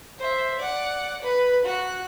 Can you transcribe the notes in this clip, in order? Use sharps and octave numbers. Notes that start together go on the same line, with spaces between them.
C5 E5
D5 F#5
B4
F#4 F#6